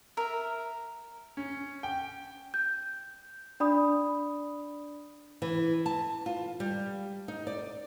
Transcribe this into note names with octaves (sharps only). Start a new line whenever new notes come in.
A#4 E5
C#4
G5
G6
D4 D5 B5 D#6
E3
A5
F4
G3
D#4
D5